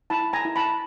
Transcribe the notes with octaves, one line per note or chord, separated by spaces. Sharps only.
E4 A5 B5
G#5 A#5
E4
A5 B5